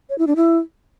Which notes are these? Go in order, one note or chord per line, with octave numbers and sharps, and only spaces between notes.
C#5
E4
D4
E4